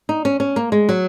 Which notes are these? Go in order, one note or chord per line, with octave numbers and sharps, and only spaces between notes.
D#4
C#4
C#4
A#3
G#3
F#3